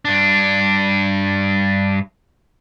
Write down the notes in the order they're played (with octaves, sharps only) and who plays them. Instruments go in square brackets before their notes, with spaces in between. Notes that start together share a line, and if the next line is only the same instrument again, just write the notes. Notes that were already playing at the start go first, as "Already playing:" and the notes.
[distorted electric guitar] G2 D4